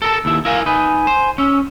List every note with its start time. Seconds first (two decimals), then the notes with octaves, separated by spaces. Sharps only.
0.02 A4 A#4 A5 E6
0.25 D#2 E4
0.45 E4 A#4 F5 G#5
0.66 D#4 B4 G#5
1.07 C5
1.38 C#4 E6